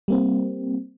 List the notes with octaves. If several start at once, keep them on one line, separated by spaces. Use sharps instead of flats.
G3 A#3 C4